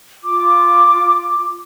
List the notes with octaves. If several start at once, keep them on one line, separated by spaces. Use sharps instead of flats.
F4 D6